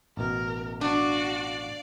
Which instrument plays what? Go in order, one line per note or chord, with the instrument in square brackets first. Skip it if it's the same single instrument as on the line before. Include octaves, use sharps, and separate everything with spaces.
[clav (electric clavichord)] A1 B2 [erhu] A#4
[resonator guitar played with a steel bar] D4 [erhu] F#4 [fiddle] D5 F5